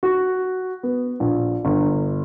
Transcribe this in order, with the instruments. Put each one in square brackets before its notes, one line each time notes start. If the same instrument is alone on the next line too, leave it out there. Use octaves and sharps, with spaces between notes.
[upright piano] F#4
B3
A#1
G1